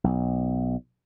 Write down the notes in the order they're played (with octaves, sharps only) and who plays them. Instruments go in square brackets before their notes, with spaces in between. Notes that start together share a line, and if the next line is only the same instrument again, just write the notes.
[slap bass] B1